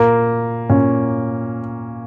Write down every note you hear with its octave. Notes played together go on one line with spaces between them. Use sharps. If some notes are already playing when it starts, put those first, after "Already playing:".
Already playing: A#2 A#3
A#2 C#4